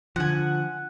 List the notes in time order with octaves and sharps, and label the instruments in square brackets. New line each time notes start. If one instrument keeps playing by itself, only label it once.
[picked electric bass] D3 F3 [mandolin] F#5 G#5